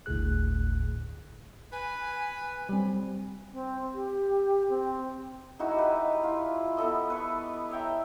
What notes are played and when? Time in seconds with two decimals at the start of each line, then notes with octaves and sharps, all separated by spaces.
0.06 G1 D2 A2 G#4 F#6
1.72 B4 G#5
2.69 G3 C4
3.52 C4
3.94 G4
4.69 C4
5.59 G#3 D#4 E4 F#4
5.74 G4 B4
6.23 E4 F4
6.77 B3 E4 A4 D#5
7.10 B4 C#6
7.70 C#5 E5 G5 A#5